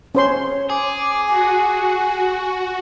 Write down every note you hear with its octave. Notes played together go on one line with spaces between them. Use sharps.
C#4 C5 C#5 C6
G#4 D6
F#4 G#5